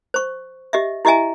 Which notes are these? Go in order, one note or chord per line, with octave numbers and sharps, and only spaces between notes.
C5 C#6
G4 D#5 E5
E4 G4 D#5 E5 G#5 A#5